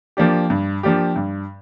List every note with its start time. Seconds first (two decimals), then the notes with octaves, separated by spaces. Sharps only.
0.17 F3 A#3 D4 G4
0.50 G2
0.83 F3 A#3 D4 G4
1.16 G2